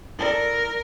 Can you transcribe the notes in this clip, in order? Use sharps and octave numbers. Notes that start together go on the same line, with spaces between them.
E4 A4 A#4 D5